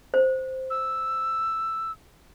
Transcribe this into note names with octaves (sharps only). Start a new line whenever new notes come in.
C5
E6